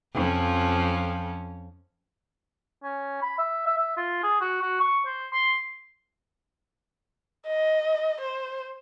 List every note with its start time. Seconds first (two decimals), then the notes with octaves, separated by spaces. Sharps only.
0.14 F2 F3 C#4
2.84 C#4
3.22 B5
3.38 E5
3.66 E5
3.78 E5
3.97 F4
4.23 G#4
4.41 F#4
4.62 F#4
4.81 C#6
5.06 C5
5.33 C6
7.47 D#5
8.21 C5